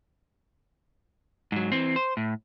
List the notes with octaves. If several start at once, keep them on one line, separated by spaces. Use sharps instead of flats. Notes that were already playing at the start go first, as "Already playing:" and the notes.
G#2 F#3
E3 C4
C5
A2